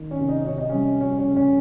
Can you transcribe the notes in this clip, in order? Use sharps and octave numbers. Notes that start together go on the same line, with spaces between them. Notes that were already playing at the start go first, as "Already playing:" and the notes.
Already playing: D#3
C#4 C#5
C3
D#4 D#5
C3 C#5
D#5
G3 C#4 C#5
F3 C#4 C#5
C#4 C#5
C#3
C#4 C#5